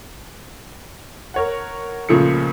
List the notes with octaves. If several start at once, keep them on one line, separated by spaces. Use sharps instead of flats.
A#4 C#5 F#5
C#2 A#2 C#3 F3 A3 C#7